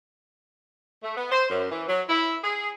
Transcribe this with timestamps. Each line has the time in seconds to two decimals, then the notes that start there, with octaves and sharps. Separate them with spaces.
1.03 A3
1.16 B3
1.31 C5
1.50 F#2
1.70 E3
1.88 F#3
2.09 E4
2.43 G#4